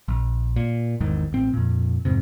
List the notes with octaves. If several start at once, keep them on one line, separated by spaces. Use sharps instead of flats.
A#1
A#2
G#1 E2 G#2 D#3
A1 C4
F2 A#2
F2 G#2 C3